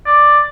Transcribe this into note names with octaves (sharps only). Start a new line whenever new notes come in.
D5